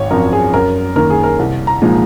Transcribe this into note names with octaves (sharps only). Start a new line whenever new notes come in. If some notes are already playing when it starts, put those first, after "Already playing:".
Already playing: G#1 C#5
F#2 F3 C4 A#4
G#4
F#2 A#4
D#3 A#3 A#4
G#4
A#4
C2
A#5
A#2 F3 G#3 D#4